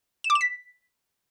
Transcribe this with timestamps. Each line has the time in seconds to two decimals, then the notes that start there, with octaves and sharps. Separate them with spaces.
0.24 E7
0.30 D6
0.35 E7
0.41 B6